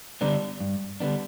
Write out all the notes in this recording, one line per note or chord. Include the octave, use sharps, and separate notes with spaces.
D3 G3 B3 D4
G2
D3 G3 B3 D4